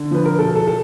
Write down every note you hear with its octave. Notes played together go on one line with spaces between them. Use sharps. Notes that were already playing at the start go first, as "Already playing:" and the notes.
Already playing: D3
F3 B4
A#4
E1 A4
A4
A4